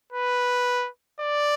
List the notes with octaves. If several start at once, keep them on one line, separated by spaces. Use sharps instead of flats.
B4
D5